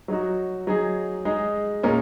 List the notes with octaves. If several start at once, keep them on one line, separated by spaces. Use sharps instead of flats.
F#3 D#4 F#4
F#3 D#4 G#4
G#3 D#4 G#4
A#2 G#3 C#4 A#4